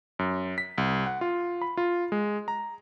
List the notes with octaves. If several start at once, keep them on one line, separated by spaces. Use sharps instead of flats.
F#2
B6
C2
F#5
F4
B5
F4
G#3
A#5